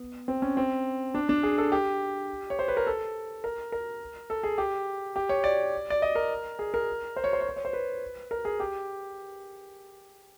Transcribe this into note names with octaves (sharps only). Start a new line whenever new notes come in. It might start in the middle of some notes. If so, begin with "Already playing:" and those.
Already playing: B3
C4
C#4
C4
D4
D4
G#4
A4
G4
C#5
C5
B4
A#4
A4
A#4
A#4
A4
G#4
G4
G4
C#5
D5
D5
D#5
A#4
G#4
A#4
C5
C#5
C5
C#5
C5
C#5
C5
B4
A#4
G#4
G4